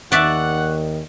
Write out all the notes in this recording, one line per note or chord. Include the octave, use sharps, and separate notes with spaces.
D#2 D#3 D5 E5 F#5 A5 C#6 F#6